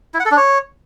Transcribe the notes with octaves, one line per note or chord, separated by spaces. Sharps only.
E4
F#5
A4
D4
C#5